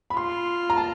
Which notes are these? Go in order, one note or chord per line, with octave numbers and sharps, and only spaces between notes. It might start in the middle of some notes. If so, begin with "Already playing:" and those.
B5
F4 C6
A#5
A5